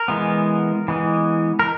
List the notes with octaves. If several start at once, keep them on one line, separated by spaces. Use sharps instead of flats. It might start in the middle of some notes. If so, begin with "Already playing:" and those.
Already playing: A#4
E3 G#3 B3
E3 G#3 B3
A#4